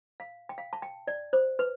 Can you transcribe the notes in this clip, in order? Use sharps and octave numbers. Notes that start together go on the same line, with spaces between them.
F5
G5
F5
A5
G5
D5
C5
B4